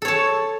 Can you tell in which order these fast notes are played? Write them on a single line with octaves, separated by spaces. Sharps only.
A4 C#5 A5